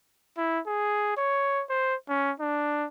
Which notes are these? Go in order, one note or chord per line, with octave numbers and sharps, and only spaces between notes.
E4
G#4
C#5
C5
C#4
D4